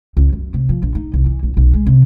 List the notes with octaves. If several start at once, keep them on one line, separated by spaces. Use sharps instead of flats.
C#2
F#2
C3
F3
A#1
D#4
C2
E3
A#1
B1
G#3
C3